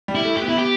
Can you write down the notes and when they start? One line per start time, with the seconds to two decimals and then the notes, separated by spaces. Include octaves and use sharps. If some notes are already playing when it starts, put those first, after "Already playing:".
0.08 G3
0.15 E4
0.25 A3
0.37 B3 G4
0.48 E4
0.58 G4